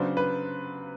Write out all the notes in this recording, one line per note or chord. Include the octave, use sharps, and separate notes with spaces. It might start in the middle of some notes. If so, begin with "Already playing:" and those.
Already playing: C#3 F#3 B3 D4 C5
B4